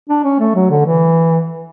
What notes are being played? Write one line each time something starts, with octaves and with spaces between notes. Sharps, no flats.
D4
C#4
A3
F#3
D3
E3